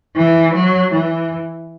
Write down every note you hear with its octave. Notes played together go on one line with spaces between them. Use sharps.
E3
F#3
E3